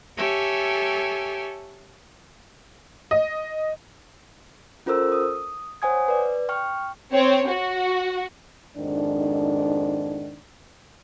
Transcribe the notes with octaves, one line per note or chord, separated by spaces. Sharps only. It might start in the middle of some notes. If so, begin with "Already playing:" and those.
G4 A4 C#5 E5 G#5
D#5
C#4 F4 A4 A#4 C5 E6
D#6
C5 C#5 F#5 G#5 D#6 G#6
B4 D5
G5 C#6 F6
C4 C#5
F#4
F2 G#2 D#3 D4